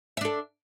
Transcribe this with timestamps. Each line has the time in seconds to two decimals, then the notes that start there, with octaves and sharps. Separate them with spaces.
0.17 E5
0.21 D4
0.25 A4